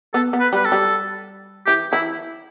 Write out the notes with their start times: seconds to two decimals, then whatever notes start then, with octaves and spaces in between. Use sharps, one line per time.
0.14 B3 A4
0.33 B3
0.40 B4
0.53 G3 B4
0.65 A4
0.72 G3
1.67 E3 G4
1.92 E3 E4